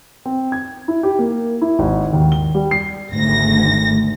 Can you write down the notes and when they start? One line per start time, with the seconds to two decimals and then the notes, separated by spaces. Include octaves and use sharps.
0.26 C4
0.52 G#6
0.88 E4
1.03 G4
1.19 A#3
1.62 E4
1.79 G#1
2.13 D#2
2.32 G7
2.55 G3
2.71 C7
3.12 G#1 D2 A#6